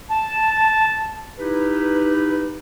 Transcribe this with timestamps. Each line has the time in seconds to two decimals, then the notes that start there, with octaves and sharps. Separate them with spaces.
0.11 A5
1.39 D#4 E4 G4 B4